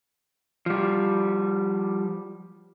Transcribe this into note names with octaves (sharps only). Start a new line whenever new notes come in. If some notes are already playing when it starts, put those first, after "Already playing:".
F3 G3